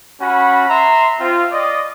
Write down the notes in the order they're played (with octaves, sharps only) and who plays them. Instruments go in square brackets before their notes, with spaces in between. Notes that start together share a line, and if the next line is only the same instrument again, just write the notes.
[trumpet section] C#4 F#4 B5
E5 A#5 C6
C4 F4
D5 D#5